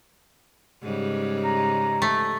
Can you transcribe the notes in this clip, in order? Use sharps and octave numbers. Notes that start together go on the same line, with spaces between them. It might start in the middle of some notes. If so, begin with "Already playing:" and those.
G#2 C#3 G3
A#5
A3